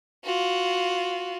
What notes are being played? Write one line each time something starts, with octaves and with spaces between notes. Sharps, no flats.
F4 F#4